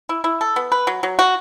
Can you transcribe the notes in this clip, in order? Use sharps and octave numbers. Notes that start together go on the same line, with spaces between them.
E4
E4
A4
B3
B4
F#3
F#3
F#4